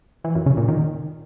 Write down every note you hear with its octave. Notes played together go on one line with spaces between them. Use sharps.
E3
F#2
C#3
A#2
D#3